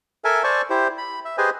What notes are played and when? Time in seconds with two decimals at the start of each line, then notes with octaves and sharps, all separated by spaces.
0.25 A4 A#4 E5 G#5
0.44 C5 D5 G#5 A5 C#6
0.70 E4 G4 C5
0.98 B5
1.25 E5
1.38 G4 G#4 B4 C5 D#5 G#5